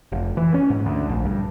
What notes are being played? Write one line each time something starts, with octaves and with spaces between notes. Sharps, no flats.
F1
E3
C#4
G#2
D2
A#1
G2